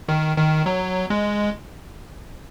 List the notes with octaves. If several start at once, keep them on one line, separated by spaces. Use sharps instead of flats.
D#3
D#3
F#3
G#3